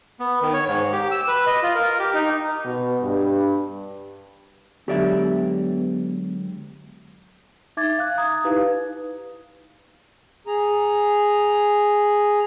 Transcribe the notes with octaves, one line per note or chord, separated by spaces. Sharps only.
B3
D#3
C#5
G#2
G4
E6
B4
D#5
F4
A#4
G4
D#4
B2
G2
D3 F#3 G#3 B3 G4 D5 E5
D#4 E5 D6 G#6 A6
F5 F#6
A#5 D#6 G#6
D#4 E4 G4 B4 F5
G#4 A#5